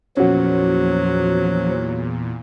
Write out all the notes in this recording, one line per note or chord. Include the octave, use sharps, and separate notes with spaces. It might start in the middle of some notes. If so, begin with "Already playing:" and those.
E2 A#2 F3 F#3 C#4 F#4